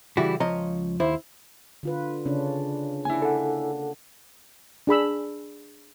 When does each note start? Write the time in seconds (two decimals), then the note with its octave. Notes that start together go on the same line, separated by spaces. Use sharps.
0.17 C#3 E3 G3 E4 F#4
0.40 C#2 F3 C#5 D#5 A#5
1.00 D#2 E4 C5
1.83 D3 F4 B4
2.26 C#3 C#4 D4
3.05 A#3 D4 E4 G#5
3.22 A4 F#5
4.87 D4 G#4 B5 E6